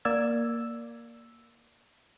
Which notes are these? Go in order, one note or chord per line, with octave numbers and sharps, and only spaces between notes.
A#3 D5 E6 G#6